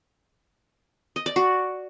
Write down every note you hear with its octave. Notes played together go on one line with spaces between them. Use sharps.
D#5
D5
F#4